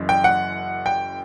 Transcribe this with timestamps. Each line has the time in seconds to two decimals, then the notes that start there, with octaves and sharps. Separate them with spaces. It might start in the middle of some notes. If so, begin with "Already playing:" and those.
Already playing: F#1 F#2 E3
0.09 G5
0.24 F#5
0.86 G5